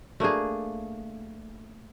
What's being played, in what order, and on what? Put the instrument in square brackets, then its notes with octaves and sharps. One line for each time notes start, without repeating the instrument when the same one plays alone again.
[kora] A3 A#3 D4 G#4